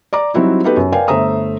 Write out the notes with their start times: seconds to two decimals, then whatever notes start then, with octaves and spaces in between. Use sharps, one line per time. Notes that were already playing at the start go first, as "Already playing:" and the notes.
0.13 D5 A#5 D6
0.34 F#3 G3 C4 D#4 E4 F#4
0.64 B3 D#4 F#4 G4 A4 B4
0.77 F#2
0.92 A#4 B4 D5 F5 G5 G#5
1.08 G1 A3 C5 E5 A#5 D#6